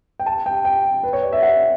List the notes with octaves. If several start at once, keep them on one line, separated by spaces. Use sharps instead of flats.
G5
A5
G5
G5
B4
C#5
D5
E5
F#5